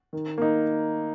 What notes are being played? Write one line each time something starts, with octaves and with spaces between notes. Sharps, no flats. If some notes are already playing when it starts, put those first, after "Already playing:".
D#3
A#3 D#4